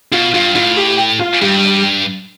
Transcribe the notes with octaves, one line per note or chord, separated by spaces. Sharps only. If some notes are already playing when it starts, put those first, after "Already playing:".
B2 F4
G2 F4
A2 F4
G4
F4
G2 G3